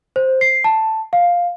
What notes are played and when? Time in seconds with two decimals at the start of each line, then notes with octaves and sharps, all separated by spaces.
0.16 C5
0.41 C7
0.64 A5
1.13 F5